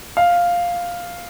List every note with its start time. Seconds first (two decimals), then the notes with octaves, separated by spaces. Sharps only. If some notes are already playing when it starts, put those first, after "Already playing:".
0.17 F5